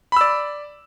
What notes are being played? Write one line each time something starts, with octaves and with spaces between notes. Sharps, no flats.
D5 B5 E6